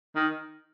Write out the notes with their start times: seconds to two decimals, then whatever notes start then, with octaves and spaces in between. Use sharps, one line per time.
0.16 D#3